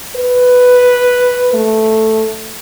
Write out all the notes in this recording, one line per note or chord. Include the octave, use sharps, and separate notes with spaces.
B4
A3